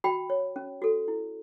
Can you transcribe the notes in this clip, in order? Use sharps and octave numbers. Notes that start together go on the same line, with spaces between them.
F#4 G5 B5
C#5
C#4
F#4 A4
E4